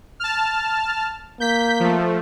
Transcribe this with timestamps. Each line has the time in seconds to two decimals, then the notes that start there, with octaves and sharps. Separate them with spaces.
0.20 A5 F6
1.40 A#3 G6 B6
1.80 F3 A3